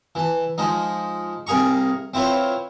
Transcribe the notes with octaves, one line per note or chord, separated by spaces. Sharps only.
E3 A5
F3 G#3 D#4
C2 A#3 G#4 A#5 C#6
C4 E4 F4 B4 C#5